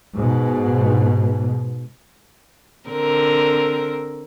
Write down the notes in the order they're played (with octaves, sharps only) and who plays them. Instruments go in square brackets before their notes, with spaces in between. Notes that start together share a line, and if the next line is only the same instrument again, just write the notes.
[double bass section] G#2 B2
[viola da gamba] D3 C4 A#4